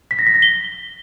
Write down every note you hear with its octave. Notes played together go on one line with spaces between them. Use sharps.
B6
A#6
B6
A#6
G7